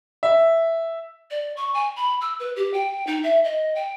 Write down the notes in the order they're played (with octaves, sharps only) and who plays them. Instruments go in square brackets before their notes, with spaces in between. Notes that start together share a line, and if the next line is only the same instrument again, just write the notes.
[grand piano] E5
[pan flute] D5
C#6
G#5
B5
E6
B4
G4
G5
D#4
E5
D#5
G5